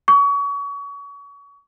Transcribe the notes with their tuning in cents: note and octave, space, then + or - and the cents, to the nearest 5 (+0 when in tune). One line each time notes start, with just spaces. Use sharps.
C#6 +30